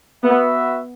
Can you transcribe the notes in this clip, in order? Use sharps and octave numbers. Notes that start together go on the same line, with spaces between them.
B3 F#4 B4 E5